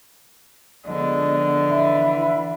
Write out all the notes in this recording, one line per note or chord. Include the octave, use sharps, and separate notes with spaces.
D3 F3 G#3 B3 D#5
E3 E5 B5